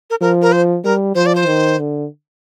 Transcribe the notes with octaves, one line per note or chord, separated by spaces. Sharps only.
A#4
F3 A#4
A#4
C5
G3 A#4
F3 C5
D5
C5
D#3
D3